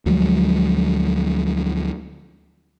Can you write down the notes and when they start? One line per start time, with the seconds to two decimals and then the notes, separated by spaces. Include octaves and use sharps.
0.06 D2 F3 F#3 G#3